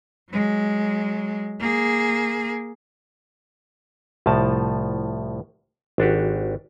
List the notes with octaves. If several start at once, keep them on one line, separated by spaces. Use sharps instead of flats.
F#3 G#3
A#3 G#4
C2 A2 F3 A5
G#1 D4 F#4 G4